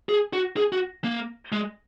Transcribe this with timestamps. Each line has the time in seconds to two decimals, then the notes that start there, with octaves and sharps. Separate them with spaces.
0.09 G#4
0.33 F#4
0.57 G#4
0.73 F#4
1.04 A#3
1.52 G#3